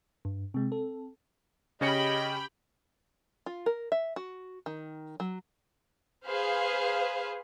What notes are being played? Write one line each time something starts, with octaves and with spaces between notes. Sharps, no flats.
G2
C3 G#3 C4
A4
C#3 C#4 G4 D#5 G5 B5 C#7
F4
A#4
E5
F#4
D#3
F#3
G#4 B4 C5 F5